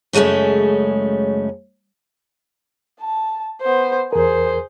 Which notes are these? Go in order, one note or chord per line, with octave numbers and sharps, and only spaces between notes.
F#2 C#3 G#3 A3 C#4
A5
B3 C5
E2 G#4 A#4 C5